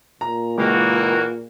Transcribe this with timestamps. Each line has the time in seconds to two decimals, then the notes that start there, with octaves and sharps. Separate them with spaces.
0.21 A#2 A#5
0.58 C#2 E3 A#3 F#4